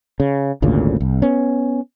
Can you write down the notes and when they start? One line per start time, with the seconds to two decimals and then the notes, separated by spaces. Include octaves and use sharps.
0.20 C#3
0.62 G#1 D2 A#2 C#3
1.00 C2
1.22 B3 C#4